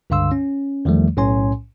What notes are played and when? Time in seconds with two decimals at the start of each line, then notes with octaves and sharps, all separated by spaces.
0.10 C#2 G2 D3 F5 C6 E6
0.32 C#4
0.85 E2 D#3 F3 G3 A3
1.17 B1 A2 C#4 C#5 G#5 C6